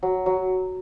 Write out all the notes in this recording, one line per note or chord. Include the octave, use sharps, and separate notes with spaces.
F#3
F#3